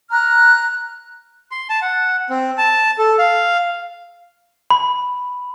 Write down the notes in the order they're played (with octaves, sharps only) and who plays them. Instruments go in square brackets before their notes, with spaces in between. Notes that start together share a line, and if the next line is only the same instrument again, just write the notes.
[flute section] A#5 F6 F#6
[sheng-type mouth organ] C6
A5
F#5
C4
A5
A4
F5
[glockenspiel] B5